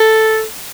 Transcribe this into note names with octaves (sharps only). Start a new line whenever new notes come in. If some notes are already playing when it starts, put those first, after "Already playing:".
Already playing: A4